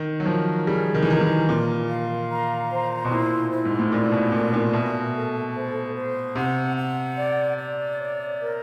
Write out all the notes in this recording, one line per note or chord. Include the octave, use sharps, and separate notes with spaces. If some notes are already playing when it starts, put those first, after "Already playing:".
Already playing: D#3
F#3
F3 A#4
G3 G#4
D#3
E3
D#3 A#5
E3
A#2 A#4
F5
A#5
C5
B2
A#2 E4
E4
G#2
A2
A#2 D5
B2
A#2 A#4
A#2
B2 E5
A4
C5
C5
C3 F#5
F#5
D5
D5
C#5
A#4